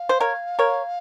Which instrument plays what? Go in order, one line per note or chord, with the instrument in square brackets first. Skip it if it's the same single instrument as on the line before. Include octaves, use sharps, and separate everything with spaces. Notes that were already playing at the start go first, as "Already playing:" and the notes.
Already playing: [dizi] F5
[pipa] C5
A#4 C#5
A#4 C#5